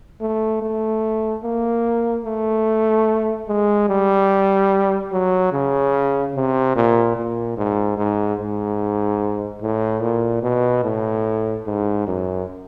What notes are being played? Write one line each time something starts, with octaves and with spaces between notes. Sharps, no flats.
A3
A3
A#3
A3
G#3
G3
F#3
C#3
C3
A#2
A#2
G#2
G#2
G#2
A2
A#2
B2
A2
G#2
F#2